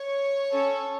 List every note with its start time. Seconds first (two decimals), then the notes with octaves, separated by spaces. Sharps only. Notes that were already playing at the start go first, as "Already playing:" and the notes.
Already playing: C#5
0.52 C#4 A4